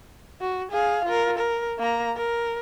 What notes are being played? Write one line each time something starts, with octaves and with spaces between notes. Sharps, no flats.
F#4
G#4 F5
F4 A#4
A#4
A#3 A#5
A#4